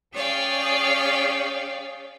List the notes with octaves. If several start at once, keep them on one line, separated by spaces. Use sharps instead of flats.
C#4 G#4 C#5 D5 F5 G5